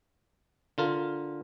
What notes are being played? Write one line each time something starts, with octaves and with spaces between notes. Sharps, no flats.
D3 F4 A#4